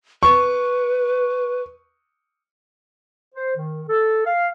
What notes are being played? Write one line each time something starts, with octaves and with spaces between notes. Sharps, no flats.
B4 C#6
C5
D#3
A4
F5